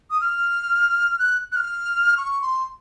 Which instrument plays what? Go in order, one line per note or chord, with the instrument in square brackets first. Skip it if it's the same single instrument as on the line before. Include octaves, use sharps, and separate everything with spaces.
[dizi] D#6
F6
F#6
F#6
F6
C#6
C6